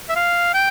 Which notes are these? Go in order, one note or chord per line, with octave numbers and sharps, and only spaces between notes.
E5
F5
G5